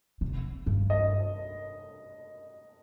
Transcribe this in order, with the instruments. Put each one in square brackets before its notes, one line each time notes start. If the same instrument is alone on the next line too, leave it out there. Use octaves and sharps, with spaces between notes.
[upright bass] C3
G2
[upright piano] D#5